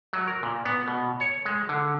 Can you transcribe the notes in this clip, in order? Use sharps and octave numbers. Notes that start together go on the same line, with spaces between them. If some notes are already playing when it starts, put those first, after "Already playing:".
F#3
A#4
A#2
B3
B2
C#5
G#3
D3